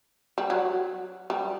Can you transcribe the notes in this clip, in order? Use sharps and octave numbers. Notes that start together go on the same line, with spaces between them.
G3
F#3
G3